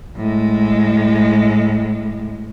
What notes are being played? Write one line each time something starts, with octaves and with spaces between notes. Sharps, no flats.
A2 G#3